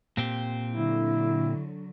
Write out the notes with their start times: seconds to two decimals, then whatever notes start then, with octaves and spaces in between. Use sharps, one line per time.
0.17 A#2 C4 G4
0.72 D3 F#3 E4